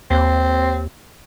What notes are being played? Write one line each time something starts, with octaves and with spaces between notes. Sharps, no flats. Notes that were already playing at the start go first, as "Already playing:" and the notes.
D#2 C4